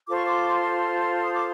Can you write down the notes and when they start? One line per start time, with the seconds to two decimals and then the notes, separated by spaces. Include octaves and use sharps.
0.07 F4 A4 C5 D6
0.17 C#6
0.26 C6 D6
1.25 D#6
1.34 D6